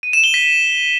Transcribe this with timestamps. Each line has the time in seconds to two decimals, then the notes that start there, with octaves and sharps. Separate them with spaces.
0.03 D#7
0.13 E7
0.24 G7
0.34 B6